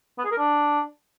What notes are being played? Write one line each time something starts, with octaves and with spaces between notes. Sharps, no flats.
B3
G#4
A#4
D4